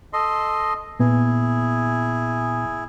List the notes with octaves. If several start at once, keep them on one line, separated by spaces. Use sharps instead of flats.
A4 D#5 C6
A#2 B3 E4 G#4